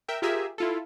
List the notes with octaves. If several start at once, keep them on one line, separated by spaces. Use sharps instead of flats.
A#4 E5 G5
F4 G4 G#4 A#4 E5 G#5
E4 F4 A4